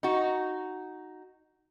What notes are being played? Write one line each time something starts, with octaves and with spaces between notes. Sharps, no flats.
D#4 F#4